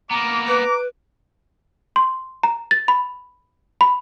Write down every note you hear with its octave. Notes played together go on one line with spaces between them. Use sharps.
A#3 B3 A#5 D6
B4 D6
C6
A#5
A6
B5
B5